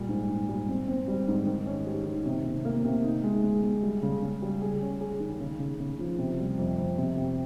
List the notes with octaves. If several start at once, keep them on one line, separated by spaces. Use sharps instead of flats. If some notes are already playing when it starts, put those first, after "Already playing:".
Already playing: A#2 G3
G#2
G#2
G3
C4
C4
G3
G#2
D#3
C#4
G4
D#3
C3
C3
A#3
C3
D#4
G#3
G#3
G#3
G3
C#3
C#3
G3
G#4
C#4
G#4
D#3
C#3
C#3
C#3
F3
C3
G3
F2
F2
C3
C3